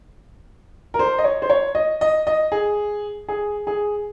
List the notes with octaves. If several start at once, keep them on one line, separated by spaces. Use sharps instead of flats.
A#4
C5
D#5
C#5
C5
C#5
D#5
D#5
D#5
G#4
G#4
G#4